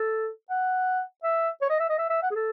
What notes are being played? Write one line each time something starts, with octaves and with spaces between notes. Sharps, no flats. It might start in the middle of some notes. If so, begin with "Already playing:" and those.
Already playing: A4
F#5
E5
C#5
D#5
E5
D#5
E5
E5
F#5
G#4
A4